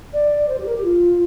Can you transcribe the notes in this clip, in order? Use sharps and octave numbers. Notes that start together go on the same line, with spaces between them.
D5
C5
G4
A#4
G4
F4